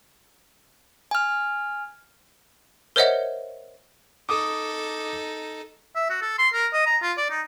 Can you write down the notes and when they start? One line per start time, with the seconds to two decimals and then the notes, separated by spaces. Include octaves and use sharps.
1.11 G#5 F6
2.96 A#4 C5 C#5 D#5 E5 F#5
4.29 D#4 A4 D6 D#6
5.96 E5
6.10 F#4
6.22 A4
6.38 C6
6.53 A#4
6.73 D#5
6.86 A#5
7.03 F4
7.17 D5
7.30 D#4